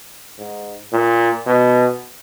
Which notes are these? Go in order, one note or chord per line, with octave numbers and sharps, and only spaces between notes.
G#2
A#2
B2